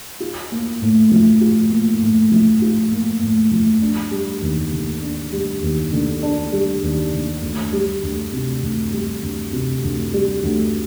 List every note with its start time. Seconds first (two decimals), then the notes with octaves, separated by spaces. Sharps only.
0.20 F4
0.52 A#3
0.82 A2
1.12 F3
1.41 F4
1.71 A#3
2.01 A2
2.32 F3
2.62 F4
2.92 A#3
3.22 A2
3.51 F3
3.82 D4
4.11 G3
4.42 D#2
4.73 D3
5.02 D4
5.32 G3
5.62 D#2
5.93 D3
6.23 D4
6.52 G3
6.83 D#2
7.12 D3
7.42 D2
7.73 G3
8.03 D2
8.33 C3
8.63 D2
8.93 G3
9.23 D2
9.53 C3
9.84 D2
10.13 G3
10.44 D2